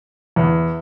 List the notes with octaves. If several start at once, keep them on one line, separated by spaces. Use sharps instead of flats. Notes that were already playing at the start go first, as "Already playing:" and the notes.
E2